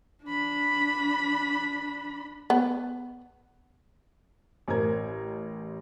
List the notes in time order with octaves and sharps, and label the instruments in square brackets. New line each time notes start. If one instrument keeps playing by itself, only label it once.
[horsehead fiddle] D4 B5
[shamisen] B3
[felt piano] A1 A#4 C5 A#5 G#6